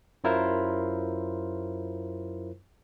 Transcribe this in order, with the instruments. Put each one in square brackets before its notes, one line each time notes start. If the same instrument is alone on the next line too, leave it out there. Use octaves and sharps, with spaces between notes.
[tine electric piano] F#2 F#3 E4 F4 A#4 C5